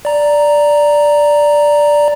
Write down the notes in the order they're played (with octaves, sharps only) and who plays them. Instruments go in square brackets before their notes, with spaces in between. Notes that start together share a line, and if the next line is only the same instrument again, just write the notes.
[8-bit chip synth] D5 A#5